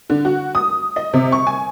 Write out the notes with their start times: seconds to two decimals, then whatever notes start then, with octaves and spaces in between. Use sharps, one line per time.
0.10 D3
0.25 F#4
0.55 D#6
0.96 D#5
1.13 C3
1.32 C#6
1.47 G#5